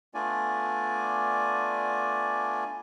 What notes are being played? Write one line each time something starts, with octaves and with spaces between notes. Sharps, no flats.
A3 B3 D4 F4 D5 G#5